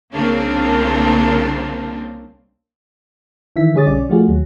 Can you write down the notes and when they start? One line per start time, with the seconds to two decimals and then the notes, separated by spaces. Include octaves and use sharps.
0.13 C2 C#3 A#3 C4 D4 F4
3.56 D#3 E3 E5 B6
3.74 D3 G3 G#4 C#5 D#6 A6
3.86 B1 C#4 D5
4.09 F3 A3 F4 F#4 G#4
4.28 D#2 F#3